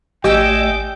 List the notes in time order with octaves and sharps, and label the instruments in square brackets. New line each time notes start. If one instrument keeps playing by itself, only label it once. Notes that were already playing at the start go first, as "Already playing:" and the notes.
[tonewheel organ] A1 A3 D5 [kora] G4 [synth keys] D#5 G#5 E6 [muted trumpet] G5